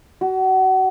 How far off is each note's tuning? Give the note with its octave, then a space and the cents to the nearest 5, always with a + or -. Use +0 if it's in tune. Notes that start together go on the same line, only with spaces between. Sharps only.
F#4 +30